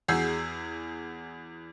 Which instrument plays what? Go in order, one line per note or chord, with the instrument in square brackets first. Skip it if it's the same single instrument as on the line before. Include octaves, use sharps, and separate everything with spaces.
[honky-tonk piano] E2 F#4 G#4 E6 G6 C7